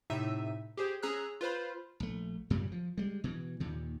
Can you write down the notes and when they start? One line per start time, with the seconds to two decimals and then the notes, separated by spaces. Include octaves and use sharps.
0.10 A2 C3 D#4 E5 E6 D#7
0.77 G4 G#4 C5
1.03 C#4 G#4 A#5 E6 F#6
1.41 F4 B4 C5 B5
2.00 A#1 A3
2.50 F#2 A#2 C#3 G3
2.72 F3
2.98 G3 G#3
3.24 B2 E3
3.60 D#2 A#2 D#3